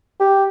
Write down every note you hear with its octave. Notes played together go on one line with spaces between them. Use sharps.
G4